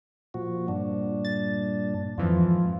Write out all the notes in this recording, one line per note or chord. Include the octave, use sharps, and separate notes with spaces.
A#2 F3 F#4
G2 A#2 D4
A6
F2 G#2 E3 F3 F4